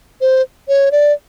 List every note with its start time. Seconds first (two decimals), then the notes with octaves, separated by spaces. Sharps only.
0.21 C5
0.68 C#5
0.92 D5